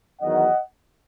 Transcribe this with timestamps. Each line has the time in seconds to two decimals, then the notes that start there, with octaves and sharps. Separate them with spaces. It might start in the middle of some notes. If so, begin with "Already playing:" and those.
0.21 E2 D#3 F#3 D#5 F#5